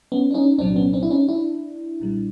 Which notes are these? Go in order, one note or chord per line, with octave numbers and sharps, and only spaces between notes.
B3 C#4
D4
C#4 D#4
C2 A#2 F#3 C4 D4
B3 C#4
C4 D4
E4
C#4 D#4
D4 E4
B1 A#2 G3